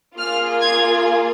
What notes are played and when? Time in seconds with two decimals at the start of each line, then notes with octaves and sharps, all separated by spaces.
0.18 A#3 F4 G#4 F6
0.61 G#6